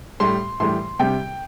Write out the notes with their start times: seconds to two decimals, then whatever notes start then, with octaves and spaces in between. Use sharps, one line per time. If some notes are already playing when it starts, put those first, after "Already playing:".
0.20 A2 G3 C6
0.60 A2 E3 G3 C6
0.99 C3 G3 G5